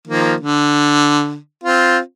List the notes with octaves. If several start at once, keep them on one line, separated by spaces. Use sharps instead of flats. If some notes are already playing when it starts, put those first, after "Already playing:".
D#3 F3 A#3
D3
C4 F4